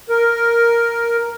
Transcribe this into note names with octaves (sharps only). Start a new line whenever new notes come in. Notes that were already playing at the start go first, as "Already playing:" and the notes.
A#4